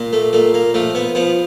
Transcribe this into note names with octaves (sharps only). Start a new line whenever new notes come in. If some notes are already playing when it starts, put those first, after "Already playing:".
Already playing: A#2
A3
A#2 A3
A#3
F3 A3
B3
F3 B3